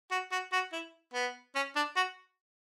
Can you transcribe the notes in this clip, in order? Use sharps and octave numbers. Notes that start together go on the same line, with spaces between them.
F#4
F#4
F#4
E4
B3
C#4
D4
F#4